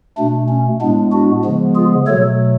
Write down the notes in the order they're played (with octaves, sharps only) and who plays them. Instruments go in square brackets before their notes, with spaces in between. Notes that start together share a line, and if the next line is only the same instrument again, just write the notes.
[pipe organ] B2 A3 D4
C#4
A2 G#3 B3 D4
D4 F#4
C#3 F3 G#3 B3
F4 G#4
B2 F#3 A3 A4 C#5